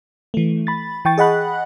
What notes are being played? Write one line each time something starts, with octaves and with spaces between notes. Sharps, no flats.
E3 A3
B5 A6
E3 G5 C#6 A6
G#4 D#5 F#5 B5 F#6